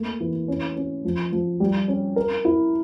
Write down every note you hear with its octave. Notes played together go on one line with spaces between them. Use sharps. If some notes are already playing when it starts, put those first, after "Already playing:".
Already playing: A3 A#3
E3
C#4
C#4
F3
F3
G3
C#4
A#4
E4